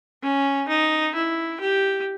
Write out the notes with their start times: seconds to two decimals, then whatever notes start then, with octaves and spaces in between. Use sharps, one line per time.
0.23 C#4
0.69 D#4
1.14 E4
1.60 G4